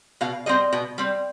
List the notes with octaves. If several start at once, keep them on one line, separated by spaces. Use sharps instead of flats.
B2 F5
G3 C4 D#5
B2
G3 C4